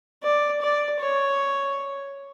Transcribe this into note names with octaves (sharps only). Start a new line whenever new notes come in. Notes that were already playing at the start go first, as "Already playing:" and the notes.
D5
D5
C#5